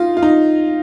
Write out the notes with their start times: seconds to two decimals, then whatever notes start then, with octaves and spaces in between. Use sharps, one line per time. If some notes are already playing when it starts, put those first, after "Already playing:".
Already playing: D#4 F4
0.17 F4
0.22 D#4